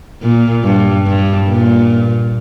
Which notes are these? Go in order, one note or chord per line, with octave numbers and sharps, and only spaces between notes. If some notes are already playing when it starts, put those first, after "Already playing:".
A#2
G2
G2
A#2